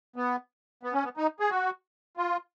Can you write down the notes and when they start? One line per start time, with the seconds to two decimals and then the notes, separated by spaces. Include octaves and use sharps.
0.16 B3
0.83 B3
0.93 C#4
1.04 B3
1.17 D#4
1.40 G#4
1.50 F#4
2.17 F4